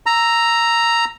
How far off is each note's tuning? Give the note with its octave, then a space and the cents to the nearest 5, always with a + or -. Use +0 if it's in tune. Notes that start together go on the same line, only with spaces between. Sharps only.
A#5 +0 E6 +5